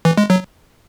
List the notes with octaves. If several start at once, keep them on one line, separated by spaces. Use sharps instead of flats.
E3
G#3
F#3